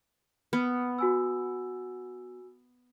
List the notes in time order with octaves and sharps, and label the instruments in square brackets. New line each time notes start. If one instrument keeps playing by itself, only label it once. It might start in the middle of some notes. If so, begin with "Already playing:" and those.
[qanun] B3 [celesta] F6
[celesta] F#4 G#5 E6